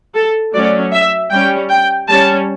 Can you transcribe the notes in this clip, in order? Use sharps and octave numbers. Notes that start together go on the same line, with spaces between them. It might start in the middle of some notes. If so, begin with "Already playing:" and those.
A4
F#3 A3 C#4 D5
E5
G3 C#4 G5
G5
G3 C#4 A5